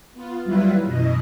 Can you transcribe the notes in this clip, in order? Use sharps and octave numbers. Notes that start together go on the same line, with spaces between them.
B3 F4
D#2 F#3 G3 E4 F4 B4
F#2 B2 E3 D#5